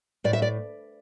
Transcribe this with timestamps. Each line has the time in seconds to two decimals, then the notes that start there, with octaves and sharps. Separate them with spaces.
0.24 A2 D5
0.33 E5
0.42 D5